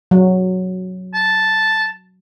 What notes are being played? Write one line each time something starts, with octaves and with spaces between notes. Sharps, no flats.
F#3
A5